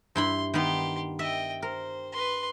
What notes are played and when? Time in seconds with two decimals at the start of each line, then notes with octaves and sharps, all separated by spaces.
0.16 G2 E4 B5 C6
0.54 D#3 B3 G4 C6
1.19 D#5 E5 G5
1.62 A#4 C5
2.12 B4 C6